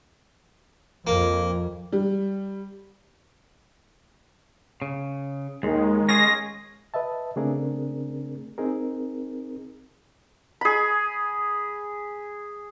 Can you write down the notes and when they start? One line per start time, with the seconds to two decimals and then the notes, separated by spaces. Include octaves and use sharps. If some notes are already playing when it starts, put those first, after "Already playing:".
1.07 F2 A#3
1.92 G3
4.82 C#3
5.63 D#2 D#3 G#3
6.09 C#4 F4 G#4 A#6
6.94 B4 D#5 E5 A5
7.36 C#3 A3 C4 D4 G#4 A#4
8.58 C4 D#4 G#4 A#4
10.61 G#4 B5